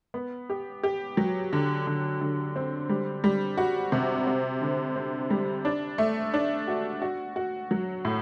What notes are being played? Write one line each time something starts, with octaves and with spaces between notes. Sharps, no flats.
B3
G4
G4
F#3
D3
D3
D3
C4
G3
G3
F#4
C3
C4
D3
C4
G3
D4
A3
D4
F#4
F#4
F#4
F#3
A2